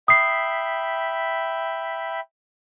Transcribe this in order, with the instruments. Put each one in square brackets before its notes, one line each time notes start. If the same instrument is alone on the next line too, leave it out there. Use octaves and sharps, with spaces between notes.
[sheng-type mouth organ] E5 G5 B5 [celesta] D#6 C7